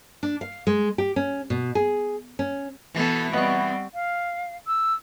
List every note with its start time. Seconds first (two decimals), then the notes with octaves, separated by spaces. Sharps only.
0.23 D4
0.41 F5
0.67 G#3
0.98 G4
1.16 C#4
1.50 B2
1.75 G#4
2.39 C#4
2.94 B2 E3 B3 A4
3.33 G3 B3 C4 D#5 F#5 C#6
3.93 F5
4.67 E6